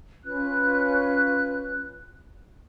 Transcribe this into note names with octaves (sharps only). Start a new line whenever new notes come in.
C#4 F4 B4 F#6